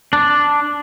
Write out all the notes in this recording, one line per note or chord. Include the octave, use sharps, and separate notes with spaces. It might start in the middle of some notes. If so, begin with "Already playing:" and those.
D4